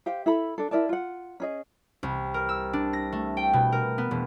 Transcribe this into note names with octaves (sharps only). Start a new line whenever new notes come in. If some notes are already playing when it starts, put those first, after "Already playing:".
G4 C5 F5 G5
E4 A4 B5
D4 A4
E4 A#4 D5 A5
F4 F#5
C#4 G#4 D#5
C2
A#4
E6
D4
A#6
A3
G5
B2
A#4
B3
E1